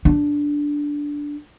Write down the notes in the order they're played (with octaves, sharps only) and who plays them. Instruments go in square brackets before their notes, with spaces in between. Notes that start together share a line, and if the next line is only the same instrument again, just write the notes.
[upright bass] D4